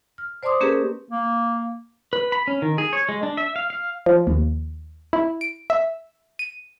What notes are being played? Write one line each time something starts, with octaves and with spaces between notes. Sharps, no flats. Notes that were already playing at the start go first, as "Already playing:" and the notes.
F6
C5 D5 A5 C6 D6 D#6
A#3 C#4 G4 G#4 A#4 B4
A#3
B4
B5
C#4
D#3
G#4
C#5
G#3
D4
E5
F5
F5
F3
D#2
E4
D7
E5
D#7